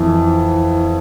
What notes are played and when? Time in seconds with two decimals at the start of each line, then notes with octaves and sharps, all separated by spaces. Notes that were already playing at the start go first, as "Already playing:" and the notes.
Already playing: F2 E3